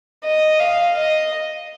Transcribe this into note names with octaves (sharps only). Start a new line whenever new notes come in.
D#5
F5
D#5